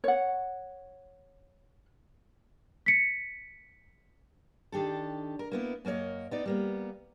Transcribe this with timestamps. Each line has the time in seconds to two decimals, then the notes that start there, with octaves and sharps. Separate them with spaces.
0.04 C#5 F#5
2.86 B6 C#7
4.72 D#3 D4 G4 A4
5.39 A#4
5.52 A#3 B3 E4
5.85 F#2 A#3 F4 C#5 D#5
6.31 B3 D#4 D5
6.45 G3 A#3 B3